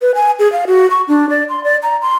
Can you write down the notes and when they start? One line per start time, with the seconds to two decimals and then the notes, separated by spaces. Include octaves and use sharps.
0.02 B4
0.15 G#5
0.39 G#4
0.53 F5
0.67 F#4
0.90 C#6
1.08 D4
1.30 D5
1.49 C6
1.64 D5
1.83 A#5
2.02 C6